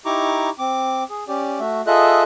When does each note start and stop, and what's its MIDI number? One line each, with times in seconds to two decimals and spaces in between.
0.05 0.50 63
0.05 0.50 64
0.05 0.50 67
0.05 0.50 82
0.05 0.50 85
0.05 0.50 86
0.59 1.04 60
0.59 1.04 86
1.10 1.24 68
1.28 1.59 61
1.28 1.59 67
1.28 1.59 74
1.60 1.81 57
1.60 1.81 66
1.60 1.81 76
1.87 2.23 65
1.87 2.23 68
1.87 2.23 69
1.87 2.23 75
1.87 2.23 76
1.87 2.23 90